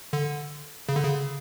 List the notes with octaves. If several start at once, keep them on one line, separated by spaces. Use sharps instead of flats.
D3
C#3
D3
C#3